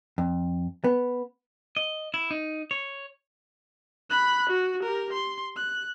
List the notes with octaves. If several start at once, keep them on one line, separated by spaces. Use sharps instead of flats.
F2
B3
D#5
E4
D#4
C#5
B5 F#6
F#4
G4 A#4
C6
F#6